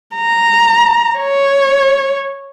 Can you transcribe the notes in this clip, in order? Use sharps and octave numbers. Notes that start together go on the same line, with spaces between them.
A#5
C#5